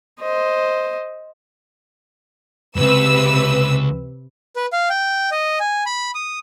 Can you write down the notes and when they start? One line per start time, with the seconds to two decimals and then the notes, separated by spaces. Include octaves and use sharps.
0.20 C5 D#5
2.76 C#2 F#2 C3 B4 E6
4.56 B4
4.73 F5
4.90 G5
5.32 D#5
5.60 G#5
5.86 B5
6.15 D#6